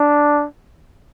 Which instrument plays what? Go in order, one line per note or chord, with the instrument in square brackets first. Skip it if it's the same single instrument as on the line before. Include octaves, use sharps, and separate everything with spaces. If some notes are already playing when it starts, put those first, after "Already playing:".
Already playing: [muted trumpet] D4